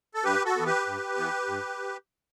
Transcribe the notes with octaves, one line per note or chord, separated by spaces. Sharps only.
A4
G2 G4 B4
F#4 A4
E3 B3
G4 B4
G2
E3 B3
G2